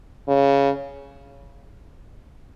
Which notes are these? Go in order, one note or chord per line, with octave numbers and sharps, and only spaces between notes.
C#3